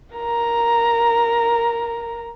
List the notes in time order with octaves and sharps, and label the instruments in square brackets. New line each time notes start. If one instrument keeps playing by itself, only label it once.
[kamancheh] A#4 A#5